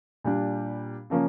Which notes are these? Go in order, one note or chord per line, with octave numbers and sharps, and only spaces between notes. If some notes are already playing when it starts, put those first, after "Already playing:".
A#2 G3 D4
C#3 F3 A#3 C#4